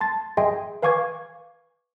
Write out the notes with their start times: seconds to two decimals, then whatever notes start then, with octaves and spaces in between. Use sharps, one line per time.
0.01 A5 C6 A6
0.37 G#4 D#5 E5 G5 G#5 C6
0.82 B4 F5 G#5 C#6 D6 G#6